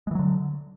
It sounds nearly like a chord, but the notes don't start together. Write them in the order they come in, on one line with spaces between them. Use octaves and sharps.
G#3 E3 F#3 D3